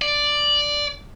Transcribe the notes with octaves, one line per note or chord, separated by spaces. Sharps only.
D5